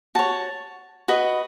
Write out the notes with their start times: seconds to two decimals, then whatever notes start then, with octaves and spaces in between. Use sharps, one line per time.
0.15 F#4 C#5 A5
1.08 F#4 B4 D#5